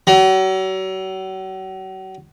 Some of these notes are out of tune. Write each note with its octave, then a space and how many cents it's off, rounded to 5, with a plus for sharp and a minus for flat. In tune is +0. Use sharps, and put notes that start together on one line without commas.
F#3 +40